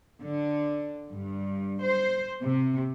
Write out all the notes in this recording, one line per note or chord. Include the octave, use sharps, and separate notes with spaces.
D3
G2
C5
C3